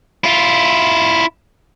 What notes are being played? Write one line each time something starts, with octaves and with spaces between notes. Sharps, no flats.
E4 F4